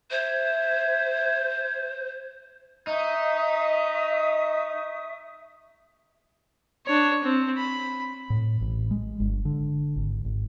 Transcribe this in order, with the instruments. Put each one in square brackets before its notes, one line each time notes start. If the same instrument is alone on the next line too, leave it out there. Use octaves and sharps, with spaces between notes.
[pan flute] C5 [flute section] E5 G#6
[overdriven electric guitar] D#4 [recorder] D#5 [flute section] E5 C#6 D#6
[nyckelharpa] D4 C#5
C4
B5
[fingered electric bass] A2
A1
G#3
G1
D3
G#1
G#1